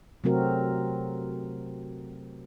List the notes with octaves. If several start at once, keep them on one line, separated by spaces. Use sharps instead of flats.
C3 F#3 A3 C4 F#4 A#4